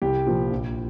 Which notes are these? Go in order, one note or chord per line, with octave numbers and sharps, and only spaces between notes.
C2 G4
A#2 F3
A#1